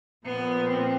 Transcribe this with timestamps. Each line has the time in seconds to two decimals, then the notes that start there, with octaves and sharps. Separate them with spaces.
0.25 A#2 F3 B3
0.68 C4